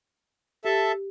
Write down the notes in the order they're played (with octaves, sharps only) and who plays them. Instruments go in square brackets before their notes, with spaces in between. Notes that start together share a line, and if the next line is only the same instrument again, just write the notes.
[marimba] G4 [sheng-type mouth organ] A4 E5 A5